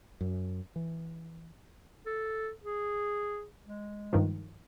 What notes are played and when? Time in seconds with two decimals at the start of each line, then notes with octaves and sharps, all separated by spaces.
0.21 F#2
0.76 E3
2.06 A4
2.64 G#4
3.66 G#3
4.13 G2 D#3 F3